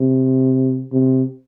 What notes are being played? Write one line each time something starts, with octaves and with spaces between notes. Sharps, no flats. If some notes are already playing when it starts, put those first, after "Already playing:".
Already playing: C3
C3